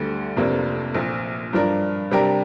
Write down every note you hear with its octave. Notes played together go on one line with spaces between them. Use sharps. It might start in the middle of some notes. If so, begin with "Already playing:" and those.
Already playing: D2 D3 G3
F1 F2 C3 A#3 D4
A#1 A#2 F3
G2 F3 D4 A#4
C3 G3 D4 G4 A#4